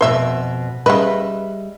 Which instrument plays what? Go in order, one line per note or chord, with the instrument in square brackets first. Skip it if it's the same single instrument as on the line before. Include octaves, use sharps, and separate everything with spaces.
[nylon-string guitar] F2 B2 [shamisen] C5 E5
[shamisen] C#3 B4 [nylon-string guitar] G3 D#5 E5